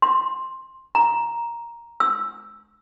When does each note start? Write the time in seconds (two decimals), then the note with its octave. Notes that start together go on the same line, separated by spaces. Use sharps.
0.02 C6
0.95 A#5
2.00 E6